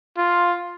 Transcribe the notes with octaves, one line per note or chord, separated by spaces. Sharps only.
F4